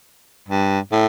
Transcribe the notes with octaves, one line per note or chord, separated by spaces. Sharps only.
G2
A2